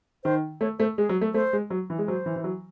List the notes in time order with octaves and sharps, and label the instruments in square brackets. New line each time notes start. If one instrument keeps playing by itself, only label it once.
[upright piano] D#3 [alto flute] C5
[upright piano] A3 [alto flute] C#5
[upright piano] A3 [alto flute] C5
[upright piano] G#3 [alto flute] G#4
[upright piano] F#3
A3
[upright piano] A3 [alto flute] C5
[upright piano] G#3
F#3
E3
G#3
[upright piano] F#3 [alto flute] C5
[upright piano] E3
E3
F#3